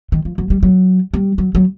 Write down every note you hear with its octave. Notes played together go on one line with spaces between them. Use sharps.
D#3
F3
F#3
G3
F#3
G3
F#3
F#3